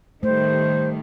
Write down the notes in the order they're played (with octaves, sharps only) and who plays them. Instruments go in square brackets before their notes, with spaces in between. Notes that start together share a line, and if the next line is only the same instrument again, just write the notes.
[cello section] D#3 G3 [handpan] A3 [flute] C5